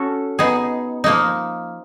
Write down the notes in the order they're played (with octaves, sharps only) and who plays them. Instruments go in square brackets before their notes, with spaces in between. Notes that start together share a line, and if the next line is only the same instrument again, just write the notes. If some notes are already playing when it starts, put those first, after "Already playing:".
Already playing: [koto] C#4 F#4 A4
B3 D#4 G#4
F3 A#3 D#4